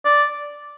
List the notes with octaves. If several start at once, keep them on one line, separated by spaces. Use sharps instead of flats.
D5